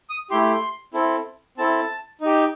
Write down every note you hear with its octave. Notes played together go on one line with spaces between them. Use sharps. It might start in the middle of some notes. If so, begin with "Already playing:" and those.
D#6
A3 E4 G4 C6
C4 E4 A4
C4 E4 A4 A5
D#4 G4